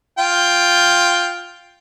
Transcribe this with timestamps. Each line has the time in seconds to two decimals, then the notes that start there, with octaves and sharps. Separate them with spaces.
0.19 F4 G5